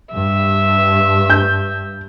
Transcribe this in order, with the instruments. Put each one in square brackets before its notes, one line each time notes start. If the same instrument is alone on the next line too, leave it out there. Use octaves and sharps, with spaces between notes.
[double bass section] G2 [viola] E5
[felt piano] G6